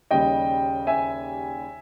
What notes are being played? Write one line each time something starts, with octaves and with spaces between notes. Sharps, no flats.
D#2 C#3 G3 D#5 G5
E5 G#5